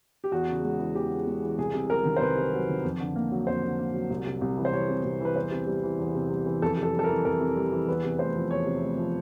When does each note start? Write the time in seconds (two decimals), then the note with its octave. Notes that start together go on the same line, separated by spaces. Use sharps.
0.24 G4
0.32 E2 F#4
0.48 C#3
0.64 G#3
0.79 E3
0.95 E2 G4
1.11 C#3
1.27 G#3
1.43 E3
1.58 C2 G#4
1.74 C3
1.89 F#3 A#4
2.05 D#3
2.16 C5
2.21 C2 B4
2.37 C3
2.53 F#3
2.68 D#3
2.84 F2
3.00 D3
3.16 A#3
3.32 F#3
3.47 F2 C5
3.63 D3
3.78 A#3
3.94 F#3
4.10 C2
4.26 C3
4.41 C2
4.57 E3
4.65 C5
4.73 C2 C#5
4.89 C3
5.04 C2
5.20 E3 B4
5.36 E2 C5
5.51 C3
5.67 G3
5.83 E3
5.99 E2
6.15 C3
6.30 G3
6.46 E3
6.62 F2 A4
6.77 C3
6.83 A4
6.93 G3
6.99 A4
7.04 A#4
7.09 E3
7.25 F2 A#4
7.41 C3
7.56 G3
7.72 E3
7.88 E2 B4
8.04 C3
8.19 A3 C5
8.36 F3
8.51 E2 C#5
8.67 C3
8.82 A3
8.98 F3